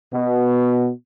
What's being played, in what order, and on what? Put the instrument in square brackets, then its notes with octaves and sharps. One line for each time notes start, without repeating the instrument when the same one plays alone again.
[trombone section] B2